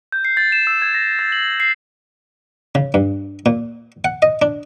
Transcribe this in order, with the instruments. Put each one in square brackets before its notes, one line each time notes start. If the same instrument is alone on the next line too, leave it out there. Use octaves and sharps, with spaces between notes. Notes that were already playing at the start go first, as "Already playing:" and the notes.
[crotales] G6
C7
A6
E7
E6
G#6
A#6
A6
F#7
C7
[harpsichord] C#3
G2
A#2
F#5
D#5
D4